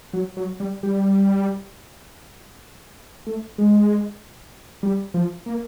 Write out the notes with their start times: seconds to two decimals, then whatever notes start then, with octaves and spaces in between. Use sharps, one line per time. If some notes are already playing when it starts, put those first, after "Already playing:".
0.13 F#3
0.37 F#3
0.60 G3
0.83 G3
3.27 A3
3.58 G#3
4.83 G3
5.14 F3
5.46 A#3